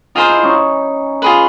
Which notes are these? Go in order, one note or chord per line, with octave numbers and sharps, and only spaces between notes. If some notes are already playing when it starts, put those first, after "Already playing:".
D#4 F4 G#4 C5 F5
E4
C#4 D#4
F4 G#4 B4